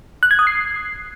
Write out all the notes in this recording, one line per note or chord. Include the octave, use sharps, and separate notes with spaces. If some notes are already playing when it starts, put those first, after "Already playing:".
F#6
G#6
D#6
C7